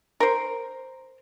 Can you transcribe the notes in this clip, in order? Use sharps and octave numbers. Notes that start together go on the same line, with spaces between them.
A#4 C5